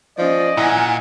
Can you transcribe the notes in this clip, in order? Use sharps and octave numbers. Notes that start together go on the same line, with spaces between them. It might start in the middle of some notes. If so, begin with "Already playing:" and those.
F3 C#4 D5 D#5
A#2 E4 F#5 G#5